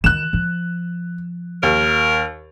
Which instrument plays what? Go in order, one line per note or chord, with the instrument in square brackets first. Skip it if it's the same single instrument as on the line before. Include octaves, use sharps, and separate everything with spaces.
[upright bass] D#3 F4 [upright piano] F#6 E7
[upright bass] F3
[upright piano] D#2 [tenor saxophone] A#4